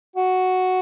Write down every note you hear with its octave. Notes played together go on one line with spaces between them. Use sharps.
F#4